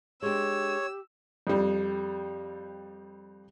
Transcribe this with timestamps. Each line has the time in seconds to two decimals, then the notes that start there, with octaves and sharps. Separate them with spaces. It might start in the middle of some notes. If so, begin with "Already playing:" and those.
0.22 G#3 D4 G4 C#5 E6
1.47 F2 G3